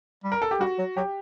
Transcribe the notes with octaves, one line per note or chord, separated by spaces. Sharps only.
G3
A#4
A4
G4
G3 F#4
F#3
F#3 G4